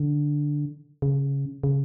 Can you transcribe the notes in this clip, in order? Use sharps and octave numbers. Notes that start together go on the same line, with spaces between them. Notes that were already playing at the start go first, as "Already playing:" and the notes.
Already playing: D3
C#3
C#3